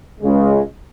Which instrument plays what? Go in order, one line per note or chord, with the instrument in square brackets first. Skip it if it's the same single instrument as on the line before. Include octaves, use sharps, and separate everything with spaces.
[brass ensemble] C#2 C#3 G#3